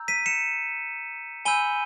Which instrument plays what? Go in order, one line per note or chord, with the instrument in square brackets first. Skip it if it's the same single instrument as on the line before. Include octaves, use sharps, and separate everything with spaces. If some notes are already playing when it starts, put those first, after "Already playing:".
Already playing: [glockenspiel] A#5 E6 G6
B6 D#7
C#7 E7
G#5 B5 E6 G6 D#7 G7